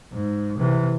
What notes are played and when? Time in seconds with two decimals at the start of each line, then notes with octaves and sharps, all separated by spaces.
0.13 G#2
0.59 C3 E3